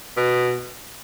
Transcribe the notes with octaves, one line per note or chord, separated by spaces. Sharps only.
B2